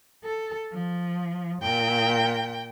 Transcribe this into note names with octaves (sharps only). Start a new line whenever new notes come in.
A4
F3
A#2 G5